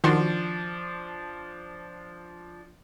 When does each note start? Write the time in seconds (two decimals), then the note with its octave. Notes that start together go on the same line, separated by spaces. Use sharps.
0.04 D#3 F3 D4 F#4 C6